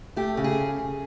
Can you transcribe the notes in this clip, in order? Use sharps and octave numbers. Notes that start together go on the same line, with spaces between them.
A3 G4
C#3
G#4